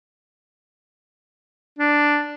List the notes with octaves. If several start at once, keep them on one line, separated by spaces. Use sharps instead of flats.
D4